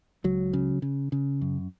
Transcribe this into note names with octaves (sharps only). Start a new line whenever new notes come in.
C#2 F#3
C#3
C#3
C#3
F#2